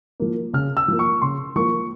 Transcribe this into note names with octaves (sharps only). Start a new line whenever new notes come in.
F3 A#3
C#3 F6
E6
F3 A#3
C#6
C#3 C6
F3 A#3 C#6